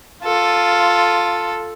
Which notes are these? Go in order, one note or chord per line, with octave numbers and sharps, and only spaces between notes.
F4 A4